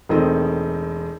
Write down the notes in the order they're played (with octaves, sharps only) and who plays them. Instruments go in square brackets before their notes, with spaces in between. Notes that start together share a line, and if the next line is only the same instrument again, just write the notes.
[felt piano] E1 D#3 A3 C4 D#5